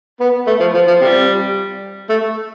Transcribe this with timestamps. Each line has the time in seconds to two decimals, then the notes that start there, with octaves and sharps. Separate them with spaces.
0.20 B3
0.47 A3
0.60 F3
0.74 F3
0.87 F3
1.01 C3 G3
2.09 A3